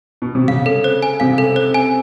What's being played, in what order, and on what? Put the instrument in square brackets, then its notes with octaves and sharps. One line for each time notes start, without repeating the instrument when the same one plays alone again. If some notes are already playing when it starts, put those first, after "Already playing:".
[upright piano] B2
C3
[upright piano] C#3 [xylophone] F5
[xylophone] A4
C5
G#5
[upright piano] C3 [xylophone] F5
[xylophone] A4
C5
G#5